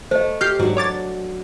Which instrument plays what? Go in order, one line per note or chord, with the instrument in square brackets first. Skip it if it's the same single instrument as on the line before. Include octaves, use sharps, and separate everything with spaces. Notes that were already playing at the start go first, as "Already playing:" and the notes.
[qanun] A3 [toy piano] C5 D#5
[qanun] G4 [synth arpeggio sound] F6 G6 C7
[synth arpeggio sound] G#2 [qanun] F#3 D4
[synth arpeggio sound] C#5 D6 A6